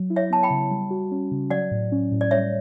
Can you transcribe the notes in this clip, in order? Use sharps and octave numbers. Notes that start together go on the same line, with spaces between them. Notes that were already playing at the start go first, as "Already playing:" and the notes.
Already playing: F#3
E4
C#5 E5
B3 A5
G5 B5
C#3
G3
F#4
C#4
C#3
F#3 D5 F#5
A2
C#4
A2
D5
G3 C#5 E5